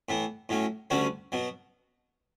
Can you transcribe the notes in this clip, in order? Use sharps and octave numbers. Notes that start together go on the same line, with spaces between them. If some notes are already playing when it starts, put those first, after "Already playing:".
A2 E3 B3
A2 F#3 C#4
D2 D3 G3 C#4 F#4
B2 F#3